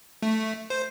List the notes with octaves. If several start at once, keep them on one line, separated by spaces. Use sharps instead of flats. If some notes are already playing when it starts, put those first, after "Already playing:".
A3
C5